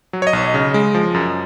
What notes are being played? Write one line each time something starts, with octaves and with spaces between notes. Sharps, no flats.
F#3
C#5
D#5
B1
C#3
G#3
F3
F#2